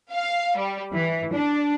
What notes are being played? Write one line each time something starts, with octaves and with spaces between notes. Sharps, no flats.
F5
G3
E3
D4